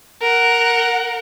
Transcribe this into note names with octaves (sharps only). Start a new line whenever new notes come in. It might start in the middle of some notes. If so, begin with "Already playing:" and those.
A#4 F#5